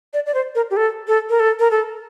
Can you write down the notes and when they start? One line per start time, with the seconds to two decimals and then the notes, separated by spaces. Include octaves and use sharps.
0.14 D5
0.26 D5
0.34 C5
0.55 A#4
0.71 G4
0.77 A4
1.08 A4
1.30 A#4
1.40 A4
1.60 A#4
1.71 A4